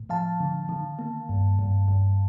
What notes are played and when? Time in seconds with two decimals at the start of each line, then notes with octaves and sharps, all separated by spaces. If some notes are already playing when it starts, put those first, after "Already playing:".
Already playing: A2
0.09 F3 F5 A5
0.40 D3
0.69 D#3
0.99 A#3
1.29 G2
1.59 G2
1.88 G2